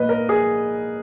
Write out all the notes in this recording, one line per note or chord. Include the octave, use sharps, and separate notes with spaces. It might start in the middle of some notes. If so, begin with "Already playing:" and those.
Already playing: A#2 B4 D#5
A#4
G#4